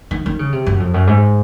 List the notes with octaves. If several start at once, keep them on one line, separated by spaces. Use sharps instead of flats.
D#3
D#3
C#3
C3
F#2
F2
F#2
G#2